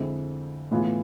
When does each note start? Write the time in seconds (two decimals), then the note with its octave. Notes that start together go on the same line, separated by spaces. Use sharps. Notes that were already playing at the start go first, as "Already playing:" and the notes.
Already playing: F2 D3 G#3 C4 E4
0.71 A2 E3 B3 F4 G#4